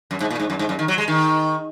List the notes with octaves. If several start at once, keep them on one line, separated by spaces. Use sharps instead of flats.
F#2
G#2
A#2
G#2
F#2
G#2
F#2
D#3
F#3
G#3
D#3